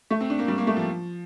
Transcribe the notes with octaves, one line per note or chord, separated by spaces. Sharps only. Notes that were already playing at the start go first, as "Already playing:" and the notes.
A3
C4
D4
A#3
G3
A#3
A3
F3